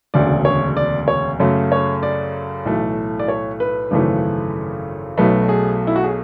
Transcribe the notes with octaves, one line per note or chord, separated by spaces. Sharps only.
E1 D2 C#3 D5
C#5
D5
C#5
F#2 C#3 F#3 A3
C#5
D5
B1 A2 E3 A3
D5
C#5
B4
G#1 F#2 C#3 E3 A3
B1 B2 F#3 A3 B4
G#4
E4
F#4
G#4